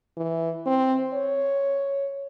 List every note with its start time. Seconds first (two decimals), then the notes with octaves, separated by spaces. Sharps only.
0.17 E3
0.66 C4
1.14 C#5